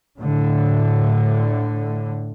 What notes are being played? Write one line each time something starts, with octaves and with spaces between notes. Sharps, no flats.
A2 D3